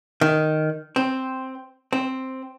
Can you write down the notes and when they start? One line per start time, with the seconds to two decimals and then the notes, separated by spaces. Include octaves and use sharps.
0.21 D#3
0.96 C4
1.93 C4